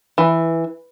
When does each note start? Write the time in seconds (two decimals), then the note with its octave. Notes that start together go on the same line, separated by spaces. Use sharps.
0.18 E3